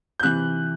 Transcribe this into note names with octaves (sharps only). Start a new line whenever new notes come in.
G6
C3 E3 F#6